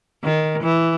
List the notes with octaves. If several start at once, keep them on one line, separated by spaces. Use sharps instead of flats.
D#3
E3